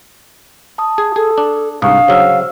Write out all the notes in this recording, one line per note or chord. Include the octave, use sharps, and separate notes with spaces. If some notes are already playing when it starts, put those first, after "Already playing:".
A5 D#6
G#4
G#4 A4
D4
C2 G#2 D4 F5 C#6 D#6
C#3 F#3 C5 E6 F6